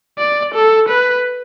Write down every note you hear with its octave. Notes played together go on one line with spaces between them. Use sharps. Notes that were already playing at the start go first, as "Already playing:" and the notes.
D5
A4
B4